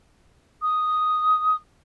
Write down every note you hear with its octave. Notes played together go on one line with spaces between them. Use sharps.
D#6